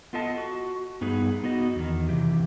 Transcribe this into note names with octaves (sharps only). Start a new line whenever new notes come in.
B3 F4 A4 D#5 A5
F#4
G2 B3 D#4 G#4 B4
B3 D#4 F#4 D#5
E2 D#3
C3 E3 G4